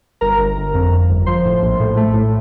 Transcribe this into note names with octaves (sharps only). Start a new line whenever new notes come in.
G1 A#4 A#5
G1
G1
F2
F2
G1
F3 C5 C6
A2
A#1
A2
A3
A2